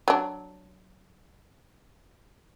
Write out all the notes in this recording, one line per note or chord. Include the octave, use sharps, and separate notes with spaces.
F#3 D4